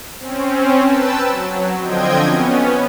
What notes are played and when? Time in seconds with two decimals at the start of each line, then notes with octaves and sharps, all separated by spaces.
0.19 C4 C#4
0.84 B4 G5 A5 E6
1.25 F#3
1.80 D3 F3 C4 D#5 G5 G#6
2.22 B3 C#4